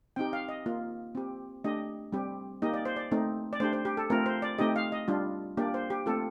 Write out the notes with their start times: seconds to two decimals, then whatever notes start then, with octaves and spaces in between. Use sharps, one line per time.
0.16 C4 D#4 G4 G5
0.33 F5
0.49 D#5
0.66 A#3 F4
1.15 C4 G4
1.64 A3 D4 G4 D#5
2.12 G3 C4 G4
2.62 A#3 D#4 G4 D#5
2.74 D5
2.85 C5
2.96 D5
3.11 A3 C4 D#4
3.53 D5
3.60 A3 D4 G4 C5
3.73 C5
3.85 G4
3.97 A4
4.10 A3 C4 F4 A#4
4.26 C5
4.42 D5
4.59 A3 C4 D#4 G4 D#5
4.76 F5
4.92 D#5
5.08 G3 D4 F4
5.57 A#3 D4 G4 D5
5.74 C5
5.90 G4
6.06 A3 C4 F4 A4